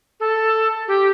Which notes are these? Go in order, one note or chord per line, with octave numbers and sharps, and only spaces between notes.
A4
G4